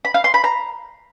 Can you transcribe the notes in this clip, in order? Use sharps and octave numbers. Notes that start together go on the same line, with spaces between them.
B5
F5
C6
B5
A#5